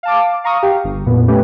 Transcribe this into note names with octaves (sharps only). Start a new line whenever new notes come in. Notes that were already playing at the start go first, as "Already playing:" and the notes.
F5 A5 D6
F5 A#5 C#6 D#6
G4 F5
G1
F2 A#2 B3
A3 C#4 G4 B4